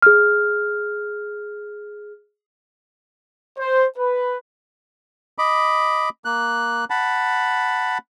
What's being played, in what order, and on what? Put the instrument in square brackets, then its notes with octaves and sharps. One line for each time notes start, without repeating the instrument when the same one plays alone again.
[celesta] G#4 F6
[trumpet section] C5
B4
[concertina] D#5 B5 D6
A#3 F#6
F#5 A5 B5